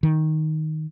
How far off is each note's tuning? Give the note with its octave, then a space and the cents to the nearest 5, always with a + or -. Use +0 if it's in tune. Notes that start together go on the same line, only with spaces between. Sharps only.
D#3 +5